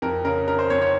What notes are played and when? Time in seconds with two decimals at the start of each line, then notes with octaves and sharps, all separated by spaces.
0.02 F2 A#4
0.25 C#3 A#4
0.48 C#3 A#4
0.59 C5
0.70 F2 C#5
0.82 C#5